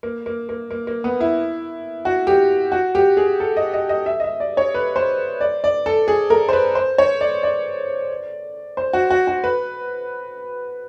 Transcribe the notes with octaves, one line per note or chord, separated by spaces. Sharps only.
A#3
A#3
A#3
A#3
A#3
B3
E4
F#4
G4
F#4
G4
G#4
A4
D#5
D#5
D#5
E5
D#5
E5
D5
C#5
B4
C5
D5
D5
A4
G#4
A#4
C5
B4
C5
C#5
D5
D5
C5
F#4
F#4
F#4
B4